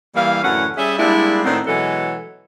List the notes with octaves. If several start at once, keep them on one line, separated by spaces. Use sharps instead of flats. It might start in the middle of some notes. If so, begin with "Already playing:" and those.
E3 G3 A#3 E4 F5
F#2 A2 D3 E3 C#4 F#5
G3 C#4 G#4 E5
G3 G#3 A#3 D4 E4
A2 D#3 A3 B3 C4 D4
B2 E3 F#3 G#3 A4